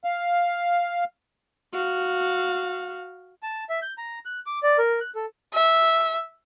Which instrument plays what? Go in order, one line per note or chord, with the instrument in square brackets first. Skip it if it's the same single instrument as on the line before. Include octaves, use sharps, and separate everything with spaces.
[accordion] F5
[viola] F#4 F5
[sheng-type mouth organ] A5
E5
G6
A#5
F#6
D6
D5
A#4
F#6
A4
[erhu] E5